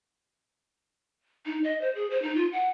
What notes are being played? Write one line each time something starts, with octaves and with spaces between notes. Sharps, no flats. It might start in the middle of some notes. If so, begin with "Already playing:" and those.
D#4
D#5
C5
G#4
C5
D#4
F4
F#5